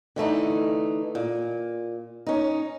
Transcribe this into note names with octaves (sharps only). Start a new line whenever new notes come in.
D3 E3 A3 D#4
A#2
C#4 D#4